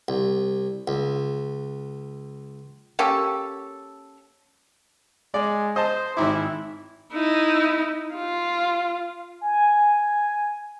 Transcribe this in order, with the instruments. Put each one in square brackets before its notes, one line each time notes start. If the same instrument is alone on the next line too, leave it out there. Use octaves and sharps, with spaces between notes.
[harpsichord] C2
C#2
[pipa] A#3 C#4 G4 A4
[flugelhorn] G#3 [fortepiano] D5
[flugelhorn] C5 [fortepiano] D#5 A5
[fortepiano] G#1 G#2 D6 [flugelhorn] E4
[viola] D#4 E4
F4
[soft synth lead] G#5